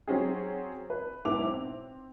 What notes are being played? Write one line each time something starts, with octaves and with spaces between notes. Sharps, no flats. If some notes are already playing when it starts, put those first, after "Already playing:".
F#3 C4 C#4 G#4
B4
B1 G#2 B3 E4 D6 F7
C4